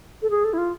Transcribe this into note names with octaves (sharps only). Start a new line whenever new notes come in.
A4
G#4
A4
E4
F4